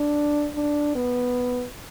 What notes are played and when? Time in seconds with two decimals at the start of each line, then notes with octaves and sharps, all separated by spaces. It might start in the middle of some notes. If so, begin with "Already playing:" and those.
Already playing: D4
0.56 D4
0.95 B3